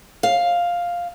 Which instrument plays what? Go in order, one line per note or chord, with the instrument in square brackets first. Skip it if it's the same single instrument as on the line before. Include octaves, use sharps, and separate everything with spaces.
[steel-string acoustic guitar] F5